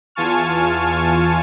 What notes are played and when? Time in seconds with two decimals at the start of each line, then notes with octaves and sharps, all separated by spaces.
0.15 E2 F4 G#5 A5 C#6 F6